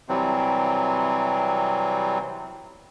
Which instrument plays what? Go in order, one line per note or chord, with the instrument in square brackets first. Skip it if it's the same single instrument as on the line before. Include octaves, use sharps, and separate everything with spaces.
[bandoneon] C3 E3 F#3 G3 C4